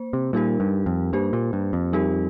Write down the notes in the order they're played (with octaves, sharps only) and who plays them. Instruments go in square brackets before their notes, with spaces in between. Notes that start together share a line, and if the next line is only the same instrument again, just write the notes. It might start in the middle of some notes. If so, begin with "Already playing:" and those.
Already playing: [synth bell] A#3 C5
[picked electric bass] C3
[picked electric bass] A#2 [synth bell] G3 D#4 G4 A#4
[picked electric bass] G2
F2
[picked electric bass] G2 [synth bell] A#3 G4 C5
[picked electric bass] A#2
G2
F2
[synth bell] G3 D#4 G4 A#4